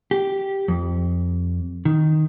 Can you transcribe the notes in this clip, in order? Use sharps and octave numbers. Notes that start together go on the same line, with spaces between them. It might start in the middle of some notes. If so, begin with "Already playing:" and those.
G4
F2
D#3